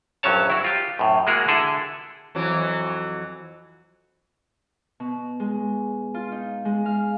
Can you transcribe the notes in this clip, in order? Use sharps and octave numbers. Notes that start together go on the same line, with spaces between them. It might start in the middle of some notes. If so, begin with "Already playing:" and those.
A#1 G2 F#3 C#4 C#5 A5
E4 F#4
F4 G4
F#2 A2
G#3 A#3 E4 F#4 G#4 A#4
D3 E4 G#4 A4
F2 E3 F#3
B2
G#3
F4
D#4
G#3
F5